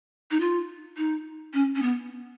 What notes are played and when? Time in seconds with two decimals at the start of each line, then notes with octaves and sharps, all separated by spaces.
0.31 D#4
0.40 F4
0.97 D#4
1.54 C#4
1.75 C#4
1.82 B3